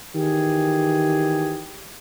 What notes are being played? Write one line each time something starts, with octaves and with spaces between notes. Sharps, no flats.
D#3 E3 G4 G#4